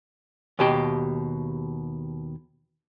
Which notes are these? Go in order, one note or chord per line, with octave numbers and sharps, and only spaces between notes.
D#2 B2 G4